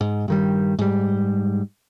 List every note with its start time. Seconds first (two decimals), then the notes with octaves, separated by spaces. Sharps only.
0.01 G#2
0.28 G2 D#3 G3
0.79 G#2 G3